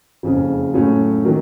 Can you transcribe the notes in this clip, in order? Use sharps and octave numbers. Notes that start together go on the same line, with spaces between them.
F#1 F2 C#3
A2 F#3 A3 C#4
D#3 F#3 A#3